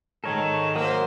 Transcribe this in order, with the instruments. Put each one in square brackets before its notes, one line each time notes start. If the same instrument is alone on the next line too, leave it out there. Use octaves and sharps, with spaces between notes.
[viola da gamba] G#2 D#3 [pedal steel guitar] A4 A#4 C#5
[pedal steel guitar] F#3 D#6 F6 [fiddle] A#3 C5